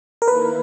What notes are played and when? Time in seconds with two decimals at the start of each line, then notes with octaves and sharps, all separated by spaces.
0.22 A#4
0.28 D#3 A#3 E4 B4